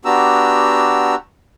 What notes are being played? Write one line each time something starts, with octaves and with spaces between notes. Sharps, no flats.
B3 D4 F#4 G4 A#5 E6